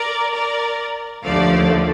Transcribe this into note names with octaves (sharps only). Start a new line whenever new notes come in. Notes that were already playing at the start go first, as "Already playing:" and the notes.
Already playing: A#4 D5
A#4 D5
D#2 D3 F3 A3 D5 F5